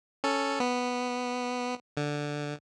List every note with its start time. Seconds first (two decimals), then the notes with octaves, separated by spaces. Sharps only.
0.24 C#4 A4
0.60 B3
1.97 D3